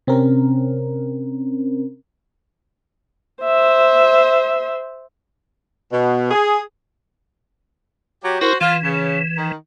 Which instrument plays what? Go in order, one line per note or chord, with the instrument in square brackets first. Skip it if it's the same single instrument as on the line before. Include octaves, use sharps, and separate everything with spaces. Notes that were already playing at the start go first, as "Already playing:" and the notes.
[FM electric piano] C3 C4 C#4 A#4
[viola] C5 E5
[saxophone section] B2
G#4
F#3 G4
[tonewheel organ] E4 A#4 [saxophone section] F#4 C5
[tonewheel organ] E3 [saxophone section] F4
[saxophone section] C#3
D#3